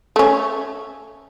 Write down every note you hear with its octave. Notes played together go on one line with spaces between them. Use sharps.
A3 C#4